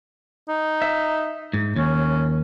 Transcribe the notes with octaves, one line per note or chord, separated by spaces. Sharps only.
D#4
E5
G#2
D#2 C#4